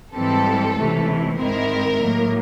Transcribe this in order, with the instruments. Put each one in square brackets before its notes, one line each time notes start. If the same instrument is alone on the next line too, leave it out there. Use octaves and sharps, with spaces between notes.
[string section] G#2 E3 G3 C4 A4
C#2 C3 E3 A3
G#2 D#3 G#3 C4 E4 A#4
A2 F#3 A#3